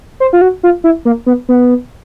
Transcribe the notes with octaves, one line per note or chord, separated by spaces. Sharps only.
C5
F4
F#4
F4
E4
A#3
B3
B3